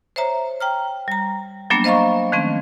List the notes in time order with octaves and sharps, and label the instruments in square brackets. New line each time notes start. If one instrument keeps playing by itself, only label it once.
[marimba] C5 C#5 E5 A#5
G5 A#5 F6
G3 A#5
F#3 G3 A#3 B3 D4
C5 D#5 F5 A#5 C#6
D#3 F3 A3 C4 C#4